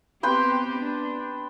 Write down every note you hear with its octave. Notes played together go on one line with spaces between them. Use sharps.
B3 C4 G4 B4 G5 C6
D4